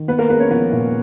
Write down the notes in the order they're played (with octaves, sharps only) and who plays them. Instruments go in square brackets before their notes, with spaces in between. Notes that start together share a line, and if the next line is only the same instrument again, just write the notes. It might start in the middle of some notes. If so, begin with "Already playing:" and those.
Already playing: [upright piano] D#3
B3 B4
A#3 A#4
G#3 B3 B4
C#4 C#5
F3 B3 B4
A#2